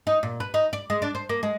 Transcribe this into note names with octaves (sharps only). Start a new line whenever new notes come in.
D#4
A#2
B4
D#4
D5
G#3
D4
C5
A#3
G#3